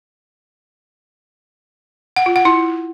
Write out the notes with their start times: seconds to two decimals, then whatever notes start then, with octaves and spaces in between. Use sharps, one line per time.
2.16 F#5
2.26 F4
2.36 F#5
2.45 E4